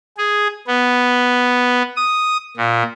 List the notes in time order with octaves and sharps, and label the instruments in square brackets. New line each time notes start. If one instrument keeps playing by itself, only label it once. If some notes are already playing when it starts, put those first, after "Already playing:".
[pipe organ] G#4
B3
D#6
A#2